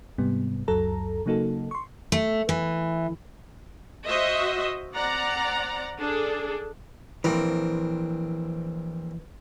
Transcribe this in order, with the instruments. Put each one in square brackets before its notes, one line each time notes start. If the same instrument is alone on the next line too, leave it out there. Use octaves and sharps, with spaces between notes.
[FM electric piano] G#2 C3 G3 B3
C#2 F#2 F#3 A4 A#5
C#3 F#3 A#3 D#4 F#4 A4
C6 C#6
[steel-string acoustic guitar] A3
E3
[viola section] F#4 C5 D#5 E5
C4 D5 F#5 A#5
D4 G#4 A4
[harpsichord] A#1 C4 A#4 [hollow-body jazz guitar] E3